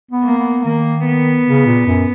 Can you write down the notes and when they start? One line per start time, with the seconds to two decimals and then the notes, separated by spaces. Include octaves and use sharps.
0.11 B3
0.24 A#3
0.38 B3
0.65 D#3 A#3
1.06 B3
1.47 C#3
1.66 A#2
1.87 F#2